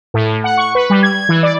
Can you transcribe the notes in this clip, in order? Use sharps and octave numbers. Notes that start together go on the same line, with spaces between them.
A2
F#5
C#6
B4
G3
G#6
E3
D5